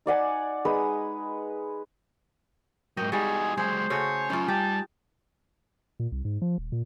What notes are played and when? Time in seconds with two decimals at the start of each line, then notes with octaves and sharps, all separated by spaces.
0.06 D#4 D5 F#5 G#5
0.65 G#3 D#4 B4 D#6
2.97 G#2 F#3 A#4 D#5 G5
3.12 G3 G#3 D#4 F#4 G#4 G#5
3.57 F#3 G#3 G#4 C5
3.90 C#3 A3 F#4 C#5 G#5
4.30 F#3 C#4 D#4 F4
4.48 G3 G4 A5
6.00 A#2
6.12 C2
6.25 G#2
6.42 F3
6.58 D#1
6.72 A#2